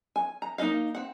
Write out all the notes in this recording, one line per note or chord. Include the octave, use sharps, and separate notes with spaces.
G#5
A#5
A#3 D#4 G#4 D#5 F5
C4 F#5